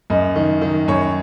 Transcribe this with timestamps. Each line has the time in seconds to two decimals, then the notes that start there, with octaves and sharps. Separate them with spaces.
0.10 F#2 D#5
0.36 D#3
0.62 D#3
0.88 F#2 C#5